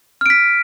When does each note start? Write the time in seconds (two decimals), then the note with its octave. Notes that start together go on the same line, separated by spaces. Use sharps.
0.21 F6
0.26 D7
0.30 B6